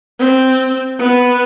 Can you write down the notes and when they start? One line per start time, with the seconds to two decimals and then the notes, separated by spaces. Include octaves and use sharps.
0.19 C4
0.99 B3